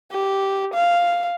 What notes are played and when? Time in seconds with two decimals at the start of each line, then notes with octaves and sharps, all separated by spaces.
0.12 G4
0.74 F5